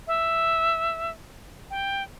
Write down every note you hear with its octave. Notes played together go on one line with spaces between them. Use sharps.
E5
G5